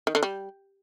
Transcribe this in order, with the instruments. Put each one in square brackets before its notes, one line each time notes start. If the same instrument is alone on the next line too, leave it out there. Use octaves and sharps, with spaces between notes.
[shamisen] D#3
D3
G3